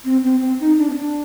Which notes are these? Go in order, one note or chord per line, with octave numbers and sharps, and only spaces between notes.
C4
C4
C4
D#4
D4
C4
D4